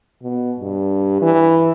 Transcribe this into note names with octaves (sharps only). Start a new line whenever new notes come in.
B2
G2
E3